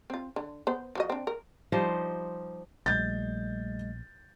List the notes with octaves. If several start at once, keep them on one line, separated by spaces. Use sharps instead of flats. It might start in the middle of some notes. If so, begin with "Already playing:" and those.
C4 F4
D3
B3 C5
F3 F#4 D#5
C4 D4
A#4
F3 G3 D#4 C5
A#1 G3 A3 D#5 G6 A6